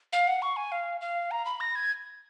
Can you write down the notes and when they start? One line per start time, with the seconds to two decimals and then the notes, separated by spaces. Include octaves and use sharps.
0.13 F5
0.27 F#5
0.42 C#6
0.56 G#5
0.72 F5
1.01 F5
1.31 A#5
1.45 B5
1.60 A#6
1.75 G#6